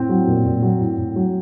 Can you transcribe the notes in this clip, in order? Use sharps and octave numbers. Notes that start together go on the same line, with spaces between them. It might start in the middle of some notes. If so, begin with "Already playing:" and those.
Already playing: A2 C4
F#3
A#2
A#2
F#3
A2
A2
F#3